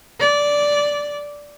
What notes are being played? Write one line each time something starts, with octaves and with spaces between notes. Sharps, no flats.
D5